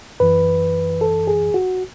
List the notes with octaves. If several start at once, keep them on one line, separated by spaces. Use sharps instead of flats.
F#2 E3 B4
A4
G#4
F#4